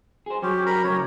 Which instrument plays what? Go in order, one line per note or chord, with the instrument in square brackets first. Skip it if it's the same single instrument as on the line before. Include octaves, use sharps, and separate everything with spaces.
[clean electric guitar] G#4 C5
[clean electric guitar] F#3 [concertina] C#4 G4
[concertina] A#4 A#5 B5
[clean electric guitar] C#3 F#3 A3 [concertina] C#5